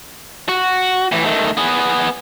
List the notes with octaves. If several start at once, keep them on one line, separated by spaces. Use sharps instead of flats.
F#4
A2 E3
D#3 A3
B3 G#4